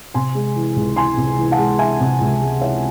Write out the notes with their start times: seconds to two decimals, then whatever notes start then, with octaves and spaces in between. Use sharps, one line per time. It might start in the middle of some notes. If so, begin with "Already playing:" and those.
0.14 C3 G#5 C6
0.35 G#3
0.56 E3
0.76 C#2
0.96 E3 G#5 C6
1.17 C3
1.38 E3
1.51 F#5 A5
1.58 G#3
1.79 E3 E5 G#5
2.00 C3
2.20 C#2
2.42 G#3
2.61 E3 C#5 E5